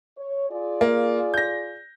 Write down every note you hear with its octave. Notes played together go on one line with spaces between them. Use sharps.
C#5
F4 G#4 D5
A#3
G6 A#6